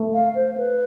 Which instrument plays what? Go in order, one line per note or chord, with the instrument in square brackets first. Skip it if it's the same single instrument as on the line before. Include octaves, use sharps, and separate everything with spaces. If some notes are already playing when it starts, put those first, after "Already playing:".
Already playing: [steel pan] A3
[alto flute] F5
C5
B4